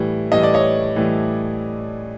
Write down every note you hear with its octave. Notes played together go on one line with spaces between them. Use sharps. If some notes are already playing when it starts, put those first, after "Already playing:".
Already playing: A2 E3 G3
A2 E3 G3 D#5
D5
C#5 D#5
A2 E3 G3